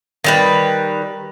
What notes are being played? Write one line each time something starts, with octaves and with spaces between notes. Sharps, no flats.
D#3 G3 B4